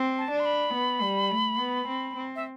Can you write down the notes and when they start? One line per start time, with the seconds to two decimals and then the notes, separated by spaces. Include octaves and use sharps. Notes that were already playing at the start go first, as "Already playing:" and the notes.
Already playing: C4
0.18 A5
0.31 D4
0.40 C6
0.45 B5
0.74 B3
1.02 G3
1.31 A3
1.59 B3
1.88 C4
2.16 C4
2.36 E5